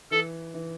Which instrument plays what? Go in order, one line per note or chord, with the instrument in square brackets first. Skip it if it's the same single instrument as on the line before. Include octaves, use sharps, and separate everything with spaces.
[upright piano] E3 [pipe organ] A4
[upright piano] E3